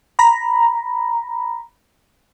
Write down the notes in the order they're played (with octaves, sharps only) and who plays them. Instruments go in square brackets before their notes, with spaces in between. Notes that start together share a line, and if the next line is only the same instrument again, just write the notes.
[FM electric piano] A#5 B5